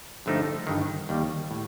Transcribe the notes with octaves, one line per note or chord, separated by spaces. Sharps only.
G2 D3 F3 A3 D#4
G1 G2 D#3
D#2 D#3 G3
A2